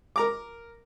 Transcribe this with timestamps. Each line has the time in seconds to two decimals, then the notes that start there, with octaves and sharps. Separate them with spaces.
0.16 A#4 A#5 D6